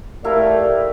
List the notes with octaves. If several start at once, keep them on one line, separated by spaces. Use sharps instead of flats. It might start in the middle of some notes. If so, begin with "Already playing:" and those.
A3 E4 G4 A#4 D5 F5